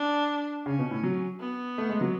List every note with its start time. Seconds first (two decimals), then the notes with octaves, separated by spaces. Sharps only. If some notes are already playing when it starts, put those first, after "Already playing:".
Already playing: D4
0.66 C#3 C#4
0.79 B2
0.91 A2
1.03 F#3
1.40 B3
1.78 A3
1.89 G#3
2.01 F#3